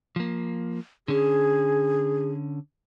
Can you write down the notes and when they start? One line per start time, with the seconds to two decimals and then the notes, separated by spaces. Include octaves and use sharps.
0.16 F3 A#3
1.08 D3 C#4 G#4